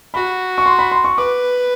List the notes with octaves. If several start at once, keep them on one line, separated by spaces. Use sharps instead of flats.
F#4 B5
C#6
C6
B5
C6
C#6
B4 D6